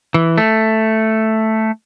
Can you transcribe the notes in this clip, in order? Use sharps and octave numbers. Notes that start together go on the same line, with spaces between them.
E3
A3